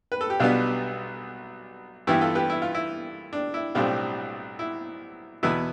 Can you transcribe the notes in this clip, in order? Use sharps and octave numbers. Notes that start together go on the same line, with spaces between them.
B4
A4
G4
B1 B2 G3 B3 D4 F4
G2 E3 B3 E4 G4
F4 A4
G4 B4
E4
F4
E4
D4
E4
B1 A2 G3 C4 D4 F4
E4
E2 B2 B3 E4